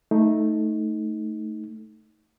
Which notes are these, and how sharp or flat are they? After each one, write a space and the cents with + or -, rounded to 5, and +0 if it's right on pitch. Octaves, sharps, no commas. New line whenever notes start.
A3 +0 D#4 +15